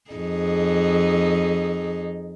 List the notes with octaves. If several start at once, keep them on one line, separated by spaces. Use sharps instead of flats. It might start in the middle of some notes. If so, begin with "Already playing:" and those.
F2 D#4 G#4